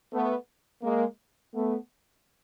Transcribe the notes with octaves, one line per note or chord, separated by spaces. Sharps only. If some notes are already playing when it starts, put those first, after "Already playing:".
A3 B3
G#3 A#3
A3 B3